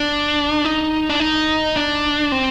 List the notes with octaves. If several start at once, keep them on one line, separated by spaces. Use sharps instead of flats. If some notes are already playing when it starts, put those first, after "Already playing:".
Already playing: D4
D#4
D4
D#4
D4
C4